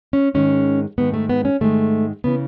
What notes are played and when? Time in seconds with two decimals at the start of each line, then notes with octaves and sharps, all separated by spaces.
0.13 C#4
0.34 G#2 D#3 G#3 C#4
0.98 G#2 D#3 G#3 B3
1.14 A3
1.29 B3
1.45 C#4
1.61 G#2 D#3 G#3 A3
2.24 C#3 E3 B3